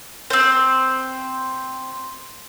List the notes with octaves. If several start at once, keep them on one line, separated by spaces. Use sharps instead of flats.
C4 C5